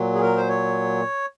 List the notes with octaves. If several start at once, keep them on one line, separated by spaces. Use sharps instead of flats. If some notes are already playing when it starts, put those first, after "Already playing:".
Already playing: A#2 F#3
G#4
A#4
C5
C#5